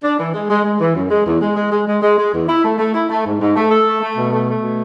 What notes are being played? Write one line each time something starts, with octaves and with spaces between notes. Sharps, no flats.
D4
E3
G#3
G#3
G#3
E3
F#2
G#3
E2
G#3
G#3
G#3
G#3
G#3
G#3
E2
E4
A3
A3
E4
A3
G#2
G#2
A3
A4
A3
A3
B2
A3
A3
B2